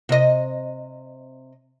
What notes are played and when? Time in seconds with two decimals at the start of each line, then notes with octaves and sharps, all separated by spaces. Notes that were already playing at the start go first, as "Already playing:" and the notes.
0.09 C3 D#5